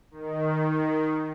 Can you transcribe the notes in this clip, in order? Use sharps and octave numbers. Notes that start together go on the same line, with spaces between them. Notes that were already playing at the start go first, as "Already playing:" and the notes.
D#3